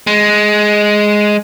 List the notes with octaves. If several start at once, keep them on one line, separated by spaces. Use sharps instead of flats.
G#3